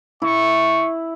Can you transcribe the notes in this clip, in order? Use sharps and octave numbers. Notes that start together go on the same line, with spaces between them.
E4 C#6